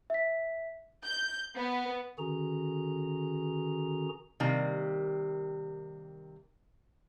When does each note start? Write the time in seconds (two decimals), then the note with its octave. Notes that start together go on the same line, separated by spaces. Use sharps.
0.10 E5 B6
1.06 G6
1.57 B3
2.18 D3 D#3 C#4 F#4 G#4 A#5
4.40 C3 D#3 G3 A#3